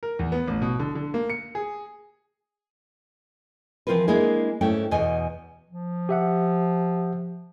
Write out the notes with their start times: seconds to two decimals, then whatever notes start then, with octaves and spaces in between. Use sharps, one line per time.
0.03 A#4
0.19 E2
0.32 B3
0.48 A1
0.62 B2
0.79 D3
0.95 D3
1.14 A#3
1.30 C#7
1.55 G#4
3.87 E3 F3 C4 F4 A#4 B4
4.08 G#3 A#3 D4 E4 G#4
4.61 G#2 A3 C#4 E4 G5
4.91 E2 B2 D#5 G#5
5.70 F3
6.09 G4 E5 F#5